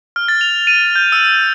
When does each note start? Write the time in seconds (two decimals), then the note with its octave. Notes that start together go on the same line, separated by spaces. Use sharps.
0.16 F6
0.28 A6
0.41 F7
0.67 D#7
0.96 G6
1.12 E6